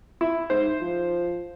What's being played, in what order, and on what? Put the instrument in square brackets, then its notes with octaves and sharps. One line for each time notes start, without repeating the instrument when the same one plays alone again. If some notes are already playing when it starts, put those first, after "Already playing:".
[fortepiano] E4
[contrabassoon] G#2 [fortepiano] C5
[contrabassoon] F3